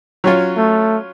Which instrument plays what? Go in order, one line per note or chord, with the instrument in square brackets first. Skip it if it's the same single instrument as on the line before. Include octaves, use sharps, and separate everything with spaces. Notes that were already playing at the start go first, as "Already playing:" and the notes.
[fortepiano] F#3 C#4 F4
[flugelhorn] A3